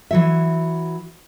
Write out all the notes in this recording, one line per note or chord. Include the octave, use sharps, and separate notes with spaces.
E3 F#3 E5